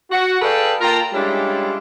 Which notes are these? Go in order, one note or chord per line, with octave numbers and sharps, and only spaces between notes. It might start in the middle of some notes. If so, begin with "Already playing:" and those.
F#4
G#4 A4 B4 D5 F5 G5
A#3 F4 A#4 G5 A5 A#5
G3 G#3 C#4 D4 E4 F4